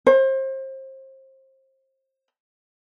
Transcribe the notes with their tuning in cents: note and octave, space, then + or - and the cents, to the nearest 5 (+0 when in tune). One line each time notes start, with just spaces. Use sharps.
C5 +30